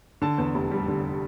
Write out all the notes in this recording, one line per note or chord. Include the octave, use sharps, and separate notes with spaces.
D3 A5
E2
F1
G3
D3